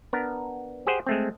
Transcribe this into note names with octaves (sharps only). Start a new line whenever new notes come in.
B3 D4 A#4
G4 G#4 C5 F#5
G#3 A3 C4